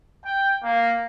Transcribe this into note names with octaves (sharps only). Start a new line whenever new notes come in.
G5
A#3